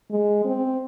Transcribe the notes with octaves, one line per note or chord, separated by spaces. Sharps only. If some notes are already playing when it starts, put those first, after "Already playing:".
G#3
C4